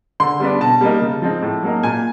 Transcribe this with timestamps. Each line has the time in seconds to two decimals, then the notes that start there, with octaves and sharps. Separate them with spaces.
0.20 D3 C6
0.40 G3 B3 D4
0.60 B2 A5
0.81 G3 A#3 D#4
1.02 C#3
1.22 F3 G#3 C4 D#4
1.42 A2
1.63 F#3 A#3 D#4
1.83 A#2 G#5